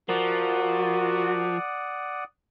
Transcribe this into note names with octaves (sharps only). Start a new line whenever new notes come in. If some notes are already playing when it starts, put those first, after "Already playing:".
F3 F#4 A#4 D5 F#5 D#6